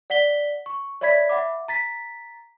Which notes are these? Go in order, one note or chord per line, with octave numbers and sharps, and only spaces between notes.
D5 F#5 B6 G7
C#6
C#5 D5 E5 B5 G#6 B6
E5 F#5 B5 D6
A#5 A6 B6